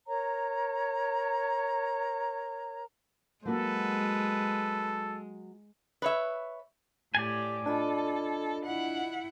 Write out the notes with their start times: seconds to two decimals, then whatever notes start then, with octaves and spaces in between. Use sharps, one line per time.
0.07 A#4 C#5 A#5
3.45 F#3 G#3 A#3 F#4 A4 B4
6.02 B4 C#5 E5
7.15 A2 G4 D5 G#5
7.66 D4 F4 A4 D#5 B5
8.65 E4 F#5